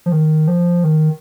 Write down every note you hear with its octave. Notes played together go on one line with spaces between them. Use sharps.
F3
D#3
F3
D#3